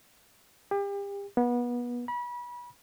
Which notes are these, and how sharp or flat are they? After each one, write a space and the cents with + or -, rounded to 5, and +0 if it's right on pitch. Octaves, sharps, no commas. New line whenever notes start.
G4 +35
B3 -25
B5 -30